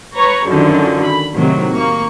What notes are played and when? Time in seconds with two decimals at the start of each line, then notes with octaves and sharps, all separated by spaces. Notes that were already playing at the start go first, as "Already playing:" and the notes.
0.14 B4 C#5 A#5 C#6
0.47 F#2 D3 D#3 F3
1.02 B5
1.35 A2 C3 D#3 F#3
1.74 A#3 C#6